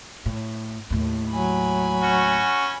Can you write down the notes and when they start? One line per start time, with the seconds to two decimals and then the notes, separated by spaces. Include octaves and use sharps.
0.26 A2
0.90 D#2 A2
1.30 F#3 G#5 B5
2.02 C#4 F#4